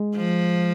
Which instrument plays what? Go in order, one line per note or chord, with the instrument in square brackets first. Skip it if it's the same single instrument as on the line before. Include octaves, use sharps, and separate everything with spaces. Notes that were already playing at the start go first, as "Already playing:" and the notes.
Already playing: [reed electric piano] G#3
[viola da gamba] F3